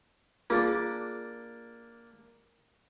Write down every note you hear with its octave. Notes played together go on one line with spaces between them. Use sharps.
A#3 D4 F4 G#4